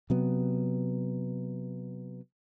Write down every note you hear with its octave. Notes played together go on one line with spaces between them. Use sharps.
C3 F#3 B3